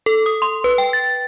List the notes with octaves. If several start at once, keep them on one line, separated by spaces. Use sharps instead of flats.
A4
D#6
C6
B4
G5
A6